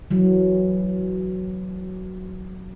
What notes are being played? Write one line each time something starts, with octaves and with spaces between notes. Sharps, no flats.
E3 F#3